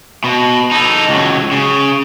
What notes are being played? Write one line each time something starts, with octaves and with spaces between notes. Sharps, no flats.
B2
D#4 A4
C#2 F#3
C#3